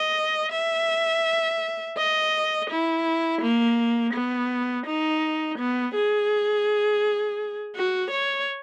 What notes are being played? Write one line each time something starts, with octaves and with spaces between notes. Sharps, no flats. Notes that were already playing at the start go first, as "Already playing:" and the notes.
Already playing: D#5
E5
D#5
E4
A#3
B3
D#4
B3
G#4
F#4
C#5